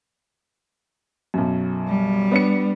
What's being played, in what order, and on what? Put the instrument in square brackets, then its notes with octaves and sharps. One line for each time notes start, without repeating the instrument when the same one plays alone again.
[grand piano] B1 F#2
[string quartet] G3
[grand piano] B3 D4 C#7